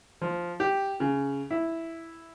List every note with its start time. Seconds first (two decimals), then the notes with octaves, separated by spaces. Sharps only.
0.22 F3
0.60 G4
1.00 C#3
1.51 E4